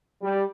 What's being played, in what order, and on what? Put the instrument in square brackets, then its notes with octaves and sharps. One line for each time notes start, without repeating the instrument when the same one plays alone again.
[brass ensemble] G3